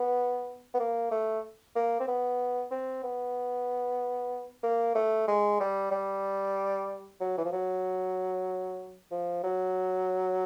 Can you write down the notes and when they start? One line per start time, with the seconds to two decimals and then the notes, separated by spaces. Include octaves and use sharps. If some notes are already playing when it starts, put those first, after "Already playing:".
Already playing: B3
0.74 B3
0.80 A#3
1.11 A3
1.76 A#3
2.00 C4
2.08 B3
2.71 C4
3.03 B3
4.63 A#3
4.95 A3
5.28 G#3
5.60 G3
5.91 G3
7.20 F#3
7.38 E3
7.45 F3
7.52 F#3
9.11 F3
9.44 F#3